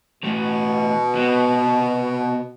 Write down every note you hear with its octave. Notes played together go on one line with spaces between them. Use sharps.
B2 E3 A3
C3 B3 F#4